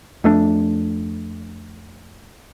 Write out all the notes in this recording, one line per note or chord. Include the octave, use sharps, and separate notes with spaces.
F2 A3 D4